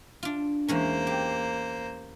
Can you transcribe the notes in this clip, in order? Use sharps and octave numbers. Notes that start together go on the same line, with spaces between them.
D4 F4
E2 G#3 A#3 C#4 C5
G4